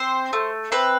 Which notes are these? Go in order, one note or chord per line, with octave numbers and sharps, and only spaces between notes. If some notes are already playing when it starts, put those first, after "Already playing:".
Already playing: C4 C5
A3
C4 B4